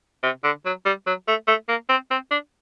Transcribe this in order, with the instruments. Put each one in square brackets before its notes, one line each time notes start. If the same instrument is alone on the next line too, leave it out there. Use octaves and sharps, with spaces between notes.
[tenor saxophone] C3
D3
F#3
G3
F#3
A3
A3
A#3
C4
C4
D4